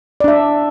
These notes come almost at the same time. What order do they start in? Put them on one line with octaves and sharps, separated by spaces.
D5 D4 E5